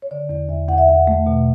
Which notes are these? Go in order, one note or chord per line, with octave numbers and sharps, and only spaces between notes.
C#5
D3 D5
E2 D5
E2 E5
E2 F#5
E5
E2 F#5
A3
B2